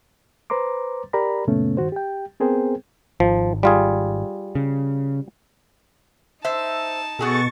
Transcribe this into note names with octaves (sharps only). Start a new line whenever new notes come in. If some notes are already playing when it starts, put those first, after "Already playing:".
B4 C5 A#5 C6 D6
G4 A#4 D5 A#5 B5
F#2 A#2 C#3 A3 B3 C#4
G2 D#3 F#4 C5
G4 G5
B3 C4 G#4 A#4 C5 G5
G#1 F3
G3 F4 G#4
C#3
D#4 C5 E5 A5
B2 F#4 G#4 A4 C#6 A6